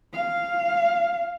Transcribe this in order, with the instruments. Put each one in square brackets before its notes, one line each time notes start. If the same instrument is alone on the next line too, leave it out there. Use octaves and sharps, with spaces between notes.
[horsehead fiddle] F5